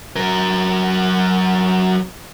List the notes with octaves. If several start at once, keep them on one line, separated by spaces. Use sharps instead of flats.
F#3 A#4